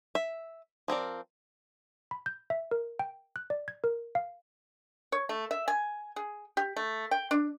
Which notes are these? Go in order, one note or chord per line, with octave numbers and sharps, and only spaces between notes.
E5
F3 C4 A#4 D5
B5
G6
E5
A#4
G5
F#6
D5
G#6
A#4
F5
C#5
A3
E5
G#5
G#4
G4
A3
G5
D4